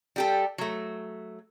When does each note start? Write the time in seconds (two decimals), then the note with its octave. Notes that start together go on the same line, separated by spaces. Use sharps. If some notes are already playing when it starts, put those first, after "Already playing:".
0.16 G3 G4 A4
0.58 F#3 A3